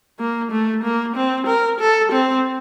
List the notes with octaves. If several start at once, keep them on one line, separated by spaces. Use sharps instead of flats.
A#3
A3
A#3
C4
A#4
A4
C4